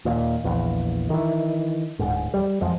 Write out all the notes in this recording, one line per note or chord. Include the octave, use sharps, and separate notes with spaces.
D#2 A#2
A#1 E2
D#3 E3
D1 G#2
G3
F2 F3 G#3